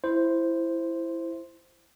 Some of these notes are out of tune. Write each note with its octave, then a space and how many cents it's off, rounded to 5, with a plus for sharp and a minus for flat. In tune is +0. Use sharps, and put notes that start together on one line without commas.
E4 +10 C5 +0